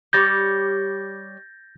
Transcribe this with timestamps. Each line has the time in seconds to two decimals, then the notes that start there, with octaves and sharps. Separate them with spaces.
0.13 G3 C#5 D5 G6 A6 A#6